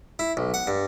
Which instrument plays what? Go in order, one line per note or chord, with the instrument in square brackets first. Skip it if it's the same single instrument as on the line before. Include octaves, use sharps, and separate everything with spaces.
[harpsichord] E4
B1
F#5
G2